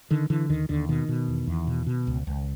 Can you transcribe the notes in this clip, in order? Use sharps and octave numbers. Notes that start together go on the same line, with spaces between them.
D3 D#3
D3 E3
D#2 D#3
D#2 D3
B2 D#3
B2
E2
E2
B2
B2
C#2
C#2